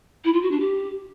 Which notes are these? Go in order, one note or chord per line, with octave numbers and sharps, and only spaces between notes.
E4
F4
F#4
D4
G4